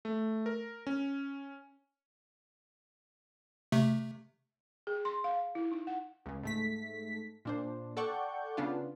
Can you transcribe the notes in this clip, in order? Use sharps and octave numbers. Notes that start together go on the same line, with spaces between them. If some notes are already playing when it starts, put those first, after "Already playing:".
A3
A#4
C#4
C3 A3
G#4
C6
F5
E4
D#4
F#5
C#2 C#3
G#2 A3 B6
A#2 D4 C5
A4 D5 F#5 G5 C#6 G6
C#3 B3 D4 F4